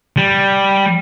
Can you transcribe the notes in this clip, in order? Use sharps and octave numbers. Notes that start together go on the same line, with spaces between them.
G3